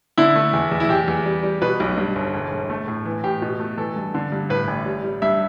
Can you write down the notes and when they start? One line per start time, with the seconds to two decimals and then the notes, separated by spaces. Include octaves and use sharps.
0.18 D3 E4
0.35 A3
0.53 E2
0.72 E2
0.80 E4
0.89 E2 G4
1.08 E2
1.26 G3
1.43 G3
1.62 B2 B4
1.80 B1
1.97 G2
2.16 G1
2.34 E1
2.52 E1
2.70 A3
2.88 A2
3.05 E3
3.24 A2 G4
3.42 B2
3.60 A3
3.78 E3 A4
3.96 G2
4.14 D3
4.32 G2
4.50 A2 B4
4.68 A1
4.86 G3
5.04 G3
5.22 G2 E5